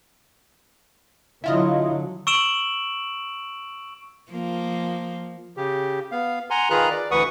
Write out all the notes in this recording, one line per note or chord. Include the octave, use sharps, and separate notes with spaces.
D3 F#3 E4 F4 D#5
C#6 E6 D7 E7 F#7
F3 A#3
C#3 G4
B3 F5
F#5 G#5 A#5 C6
D#3 F4 G#4 B4 A#5 F#6
D5
D2 E3 B4 F#5 C#6 D#6